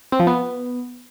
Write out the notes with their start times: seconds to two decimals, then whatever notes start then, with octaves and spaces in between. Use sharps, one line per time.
0.12 C4
0.20 F3
0.27 B3